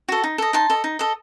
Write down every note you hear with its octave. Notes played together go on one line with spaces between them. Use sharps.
F#4 A4
D#4
A4 D#5
D#4 A5 C6
A4 D#5
D#4
A4 D#5